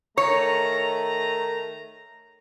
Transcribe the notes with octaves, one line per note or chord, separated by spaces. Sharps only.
D#3 A3 C#5 A#5